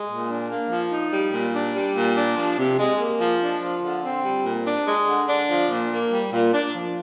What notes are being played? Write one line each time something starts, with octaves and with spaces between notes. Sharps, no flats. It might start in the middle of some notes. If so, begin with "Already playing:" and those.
Already playing: G#3
A#2
D4
A#3
F3
D#4
G3
A#2
D4
G3
A#2
D4
F3
C3
G#3
A#3
F3
D4
F3
D3
C4
G3
A#2
D4
G#3
D3
D4
F3
A#2
A#3
G3
A#2
D4
F3